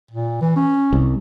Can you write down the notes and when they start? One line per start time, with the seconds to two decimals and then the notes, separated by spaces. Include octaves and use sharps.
0.11 A#2
0.41 E3
0.56 C#4
0.93 C2